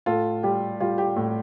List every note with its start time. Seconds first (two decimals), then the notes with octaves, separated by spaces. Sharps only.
0.06 A2 F4 A4
0.43 G3 G4
0.80 G3 F4
0.98 G4
1.16 A2